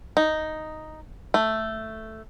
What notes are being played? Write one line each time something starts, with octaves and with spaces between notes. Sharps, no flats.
D#4
A3